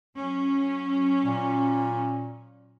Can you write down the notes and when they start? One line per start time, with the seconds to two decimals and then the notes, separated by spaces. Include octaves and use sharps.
0.16 F#3 C#4
1.24 A#2